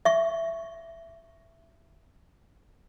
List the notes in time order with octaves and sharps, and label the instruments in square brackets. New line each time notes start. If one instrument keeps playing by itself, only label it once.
[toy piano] E5 C#6